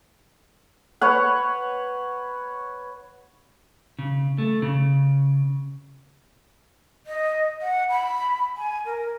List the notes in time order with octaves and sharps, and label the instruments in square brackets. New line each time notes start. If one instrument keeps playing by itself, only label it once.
[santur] B4 C#5 F#5
[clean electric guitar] C#3
A3
C#3
[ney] D#5
F#5
B5
G#5
A#4